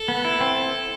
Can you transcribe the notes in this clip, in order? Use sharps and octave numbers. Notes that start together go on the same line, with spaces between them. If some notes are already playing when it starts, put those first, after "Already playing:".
Already playing: A4
B3
E4
C4